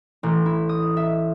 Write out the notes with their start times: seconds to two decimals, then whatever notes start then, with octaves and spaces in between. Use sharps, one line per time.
0.23 A1
0.46 E4
0.69 D#6
0.97 E5